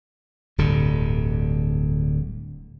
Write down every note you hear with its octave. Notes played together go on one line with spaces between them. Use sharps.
D1 G2 D3